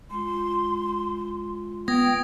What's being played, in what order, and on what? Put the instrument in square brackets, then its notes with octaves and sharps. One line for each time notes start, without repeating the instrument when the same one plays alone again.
[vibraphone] G#3 F4 [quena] C6
[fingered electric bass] B3 [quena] G5 [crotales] D#6 G#6 A#6